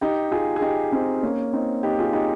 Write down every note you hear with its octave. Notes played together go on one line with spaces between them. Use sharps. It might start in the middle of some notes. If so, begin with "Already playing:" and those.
D#4 G4
F4 G#4
G#4
D#4 G4
C4 D#4
A#3 C#4
C4 D#4
D#4 G4
F4 G#4
D#4 G4